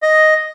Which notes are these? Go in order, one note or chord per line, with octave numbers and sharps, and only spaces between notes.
D#5